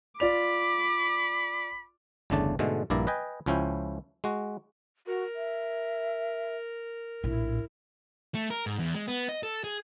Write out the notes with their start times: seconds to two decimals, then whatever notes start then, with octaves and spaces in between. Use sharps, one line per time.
0.20 F4 D5 B5 D6 F7
2.30 G1 E2 C#3 A3 D4 A5
2.59 G#2 B2 D3 G#3 A3
2.90 A#1 G2 A#3 E4 D5 A#5
3.07 B4 D#5 G5 G#5
3.46 C#2 F3 C#4 E4 G5
4.24 G#3 F#4
5.07 F#4 A#4
5.35 E5
7.24 A#1 A2 E4
8.35 A3
8.50 A#4
8.66 G#2
8.79 E2
8.94 G#3
9.08 B3
9.29 D#5
9.43 A4
9.64 G#4